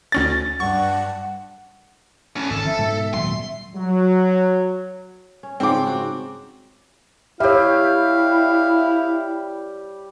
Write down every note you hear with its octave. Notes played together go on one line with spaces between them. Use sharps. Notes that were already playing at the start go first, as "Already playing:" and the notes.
D2 C#4 A6 A#6
G2 F#5 C#6
A2 C#4
G#1 D3 D#3 A4
F3 E5
G#2 B2
D#1 F#3 C6
F#3
C#4
G#2 C#3 F3 C4 D6
F#4
G3 E4 G4 C#5 E5 F5